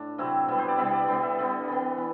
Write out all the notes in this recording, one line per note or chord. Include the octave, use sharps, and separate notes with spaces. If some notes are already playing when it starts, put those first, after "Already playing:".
Already playing: A2 D4
C3 F#3 C4 E4
C3 G3 B3 E4
C5
D5
C3 G3 B3 E5
D5
D3 G3 B3 C5
E5
D3 G3 B3
E3 B3
E3